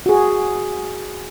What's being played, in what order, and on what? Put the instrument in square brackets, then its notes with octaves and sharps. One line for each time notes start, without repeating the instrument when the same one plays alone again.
[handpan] F#4 G#4